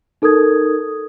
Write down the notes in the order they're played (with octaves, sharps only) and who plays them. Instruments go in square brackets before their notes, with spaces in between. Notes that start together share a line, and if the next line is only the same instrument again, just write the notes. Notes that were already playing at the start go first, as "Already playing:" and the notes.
[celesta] D#4 A4 A#4 D#6 G#6